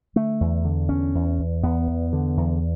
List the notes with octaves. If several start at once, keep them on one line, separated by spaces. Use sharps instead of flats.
D3 A3
E2
D3
E2 C#4
E2
E2
E2 B3
E2
D3
E2